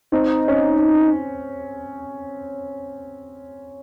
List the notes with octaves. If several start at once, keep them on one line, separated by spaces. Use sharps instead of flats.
C4 D#4
C#4